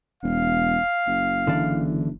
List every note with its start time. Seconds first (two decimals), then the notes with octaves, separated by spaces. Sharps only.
0.23 E1 F5
1.07 F#1
1.47 D3 E3 D4